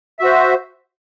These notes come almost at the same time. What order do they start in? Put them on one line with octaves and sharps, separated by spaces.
E5 F#4 C5